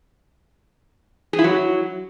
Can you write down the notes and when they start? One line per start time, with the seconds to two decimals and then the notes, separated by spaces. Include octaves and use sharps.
1.33 G#4
1.39 E4
1.44 F#3